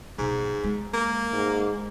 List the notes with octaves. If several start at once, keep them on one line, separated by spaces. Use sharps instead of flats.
B1 G#2
G#3
A#3
G#2